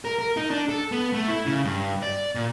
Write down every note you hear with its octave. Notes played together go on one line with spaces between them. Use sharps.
A#4
A#4
D#4
D4
A4
B3
A3
E4
C#3
G2
D5
A#2